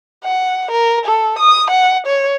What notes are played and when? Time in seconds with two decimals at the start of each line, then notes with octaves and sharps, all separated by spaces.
0.24 F#5
0.71 A#4
1.05 A4
1.39 D#6
1.71 F#5
2.07 C#5